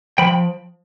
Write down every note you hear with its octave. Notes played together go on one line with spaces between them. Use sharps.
F3 G5 B5